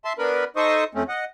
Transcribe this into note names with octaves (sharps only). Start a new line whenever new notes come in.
E5 A5 C6
B3 D4 A#4 B4 B5
D#4 A4 C5 D#5 C#6 D#6
F2 A3 C4 C#4
D#5 F#5